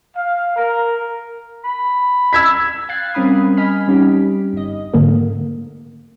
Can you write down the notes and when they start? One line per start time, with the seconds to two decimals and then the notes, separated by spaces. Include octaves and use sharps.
0.16 F5
0.56 A#4
1.64 B5
2.33 E6 G#6 B6
2.89 F5 G5 F#6 G#6 A6 C7
3.14 G3 C4 C#4 A#4 B5 D#6
3.57 D#5 G#5 B5 F6 B6
3.88 G3 C#4 D#4 G4
4.53 G1 D#5
4.94 G#2 D3 A#3 A#4